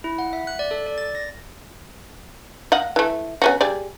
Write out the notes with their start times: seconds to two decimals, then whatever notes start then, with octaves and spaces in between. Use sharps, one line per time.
0.04 E4
0.18 F#5
0.33 E5
0.47 F#6
0.59 D5
0.71 A4
0.87 D5
0.98 A6
1.15 A#6
2.72 D#5 F5 F#5
2.96 E3 A3
3.42 B3 C#4 F#4
3.61 G3 G#4 D5